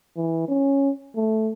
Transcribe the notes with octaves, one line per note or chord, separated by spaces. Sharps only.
E3
C#4
A3